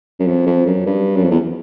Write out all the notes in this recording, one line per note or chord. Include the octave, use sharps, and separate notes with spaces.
F#2
F2
F2
F#2
G2
F#2
F2
E2